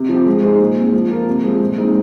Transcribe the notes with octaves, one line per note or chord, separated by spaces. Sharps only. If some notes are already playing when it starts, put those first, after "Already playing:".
Already playing: C3
F3 C4 G4
G#3
D#4 G#4 C5
A#2
G#3 C4
F3
A#3 F4 A#4
C3
F3 G#3 C4
A#2
G#3 C4 D#4